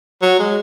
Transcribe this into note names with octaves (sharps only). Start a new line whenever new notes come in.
F#3
G#3